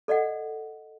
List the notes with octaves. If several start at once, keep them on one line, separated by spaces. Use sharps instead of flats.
A4 D5 D#5 F#5